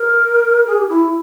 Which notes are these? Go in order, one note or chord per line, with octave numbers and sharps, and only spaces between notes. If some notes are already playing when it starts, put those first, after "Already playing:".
Already playing: A#4
G#4
G4
E4